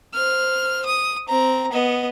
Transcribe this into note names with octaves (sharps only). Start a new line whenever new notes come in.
C5 F6
D#6
C4 A#5
B3 D#5